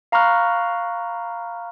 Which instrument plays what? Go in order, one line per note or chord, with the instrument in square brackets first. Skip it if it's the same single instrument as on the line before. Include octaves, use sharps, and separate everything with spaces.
[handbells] F5 A#5 B5 C#6 F6 F#6